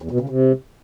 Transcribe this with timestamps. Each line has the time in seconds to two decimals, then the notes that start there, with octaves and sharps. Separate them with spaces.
0.02 E2
0.11 B2
0.20 C#3
0.29 C3